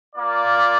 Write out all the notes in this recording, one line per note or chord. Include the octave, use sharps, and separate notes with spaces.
A#3 F4 D5